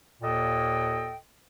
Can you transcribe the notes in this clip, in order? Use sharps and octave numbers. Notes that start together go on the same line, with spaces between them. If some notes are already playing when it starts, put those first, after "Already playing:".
D#2 A#2 A4 D#5 G5